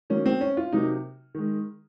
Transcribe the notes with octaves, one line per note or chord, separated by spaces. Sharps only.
D#3 F#3 A#3 C#4
C4
C#4
F4
C3 F#3 A#3 D#4
D#3 G#3